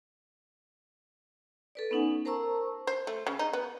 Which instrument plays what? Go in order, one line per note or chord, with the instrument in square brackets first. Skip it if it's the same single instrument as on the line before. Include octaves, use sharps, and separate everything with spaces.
[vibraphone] A4 B4 D5
B3 C#4 D#4 F#5 G#5
A#4 C5 A5 A#5 C#6 E6
[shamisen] C5
A3
C#3
D#4
B3